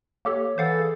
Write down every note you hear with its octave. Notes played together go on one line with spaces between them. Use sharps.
A#3 G4 A4 C#5
E3 A4 C5 F5 F#5
G#4